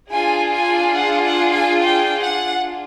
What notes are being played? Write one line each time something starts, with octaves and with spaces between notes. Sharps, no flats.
D4 F4 G#4 G#5
G#5
F#5
F#5
G#5
G5
F#5